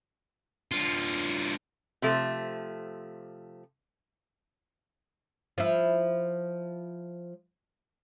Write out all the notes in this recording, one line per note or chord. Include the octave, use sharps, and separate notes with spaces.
D3 F4
C3 F3 A3
F3 E4